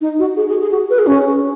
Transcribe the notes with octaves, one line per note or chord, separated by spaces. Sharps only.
D#4
F#4
G#4
G#4
G#4
F#4
B4
G#4
C#4